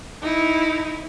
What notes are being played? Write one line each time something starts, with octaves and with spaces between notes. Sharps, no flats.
D#4 E4